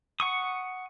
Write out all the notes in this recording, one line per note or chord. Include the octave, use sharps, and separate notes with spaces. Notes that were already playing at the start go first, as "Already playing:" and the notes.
F#5 C#6 D#6